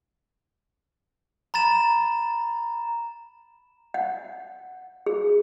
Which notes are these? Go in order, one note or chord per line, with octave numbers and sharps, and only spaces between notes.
A#5 B5 A6 E7
F#5
G#4